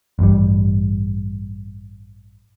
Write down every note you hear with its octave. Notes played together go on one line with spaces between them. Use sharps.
A1 G2 G3